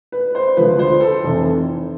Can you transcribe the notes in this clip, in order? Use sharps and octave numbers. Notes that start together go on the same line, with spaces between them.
B4
C5
D2 D3 F3 B4
C5
A4
F1 F2 E3